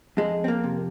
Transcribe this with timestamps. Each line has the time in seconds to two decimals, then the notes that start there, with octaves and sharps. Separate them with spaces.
0.17 F2 G#3
0.44 C4
0.48 A#3
0.64 C3